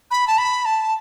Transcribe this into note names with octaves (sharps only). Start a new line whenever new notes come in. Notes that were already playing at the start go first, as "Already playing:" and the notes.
B5
A5
B5
A5